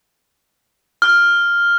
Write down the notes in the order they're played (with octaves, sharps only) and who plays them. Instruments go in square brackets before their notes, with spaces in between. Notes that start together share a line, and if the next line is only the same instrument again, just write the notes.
[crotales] F6